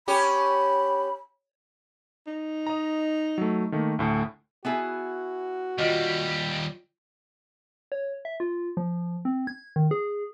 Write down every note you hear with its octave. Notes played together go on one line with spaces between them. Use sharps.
C#4 G4 B5
D#4
D#5 A#5
F#3 A3
D#3 A3 A#3
D2 A2 A5
B3 E4 F#4 G#4
D#2 G3 F4 D#5
C#5
E5
F4
F3
C4
G#6
D#3
G#4